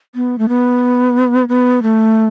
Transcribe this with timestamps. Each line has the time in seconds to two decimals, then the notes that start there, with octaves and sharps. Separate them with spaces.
0.15 B3
0.38 A3
0.49 B3
1.49 B3
1.82 A3